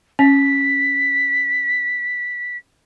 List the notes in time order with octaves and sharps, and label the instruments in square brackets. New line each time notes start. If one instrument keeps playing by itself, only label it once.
[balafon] C#4 [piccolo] B6